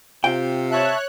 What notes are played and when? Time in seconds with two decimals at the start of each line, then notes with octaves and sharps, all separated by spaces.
0.24 C3 F4 G5
0.72 C#5 E5 A5 F#6